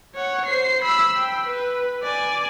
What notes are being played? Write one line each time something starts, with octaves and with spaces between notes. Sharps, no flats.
C#5 F#5
C5 C7
B5 E6
G5
B4
D5 G#5